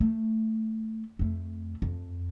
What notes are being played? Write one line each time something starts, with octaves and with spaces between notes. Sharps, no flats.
A3
F2 A3
F2